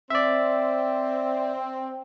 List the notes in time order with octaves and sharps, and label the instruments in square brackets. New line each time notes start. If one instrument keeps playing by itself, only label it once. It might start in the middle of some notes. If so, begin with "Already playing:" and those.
[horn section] C4 [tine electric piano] D5 E5